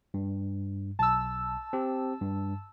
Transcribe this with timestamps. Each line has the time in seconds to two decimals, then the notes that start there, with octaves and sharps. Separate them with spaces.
0.14 G2
0.99 B1 A5 E6
1.73 C4 G4
2.21 G2